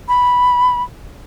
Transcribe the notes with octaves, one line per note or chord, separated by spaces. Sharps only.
B5